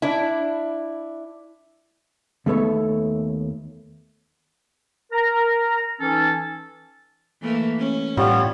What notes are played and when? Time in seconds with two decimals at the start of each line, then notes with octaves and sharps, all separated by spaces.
0.02 D4 E4
2.46 D#2 A3 B3 A4 C#5 E5
5.12 A#4 A#5
6.00 E3 C#4 D#4 A4
7.41 E3 A3 A#3
7.79 C#4
8.17 A2 G3 B3 F4 C#5